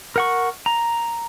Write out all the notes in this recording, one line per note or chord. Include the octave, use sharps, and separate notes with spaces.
A#4 F#5 C#6
A#5